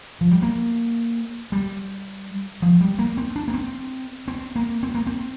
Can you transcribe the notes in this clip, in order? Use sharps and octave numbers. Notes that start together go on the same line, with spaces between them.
F3
G3
A#3
G3
F3
G3
A#3
C4
D4
A#3
C4
C4
A#3
C4
A#3
C4